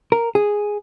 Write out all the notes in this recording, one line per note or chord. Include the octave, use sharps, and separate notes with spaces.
A#4
G#4